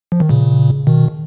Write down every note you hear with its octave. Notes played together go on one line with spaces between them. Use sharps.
F3
D#3
A#2 C#3
B2 D#3